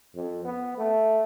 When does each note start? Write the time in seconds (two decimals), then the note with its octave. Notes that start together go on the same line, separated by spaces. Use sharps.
0.15 F2
0.45 B3
0.78 A3